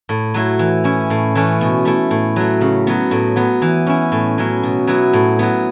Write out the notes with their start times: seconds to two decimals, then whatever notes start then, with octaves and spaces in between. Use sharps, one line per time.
0.09 A2
0.34 F#3 A3 E4
0.59 E3
0.84 C#4 E4
1.10 A2
1.35 E3 A3 C#4 E4
1.61 B2
1.85 A3 E4
2.11 A2
2.36 F#3 A3
2.61 C#3
2.87 F#3 B3
3.11 A2
3.36 F#3 B3
3.62 E3
3.86 C#4 E4
4.12 A2
4.38 F#3 C#4 E4
4.63 B2
4.87 F#3 B3 E4
5.13 A2
5.39 F#3 B3